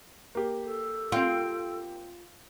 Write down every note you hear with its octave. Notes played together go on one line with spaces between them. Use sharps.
A#3 G4
A4
C4 F4 G5